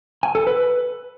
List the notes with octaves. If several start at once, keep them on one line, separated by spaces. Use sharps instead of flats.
G#5
A4
B4